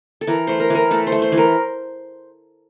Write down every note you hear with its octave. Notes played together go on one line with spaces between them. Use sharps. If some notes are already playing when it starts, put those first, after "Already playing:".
A4
E3 A#4
A3 C5
A#4
E3 A#4
A3 A4
C5
A3
C5
E3
A#4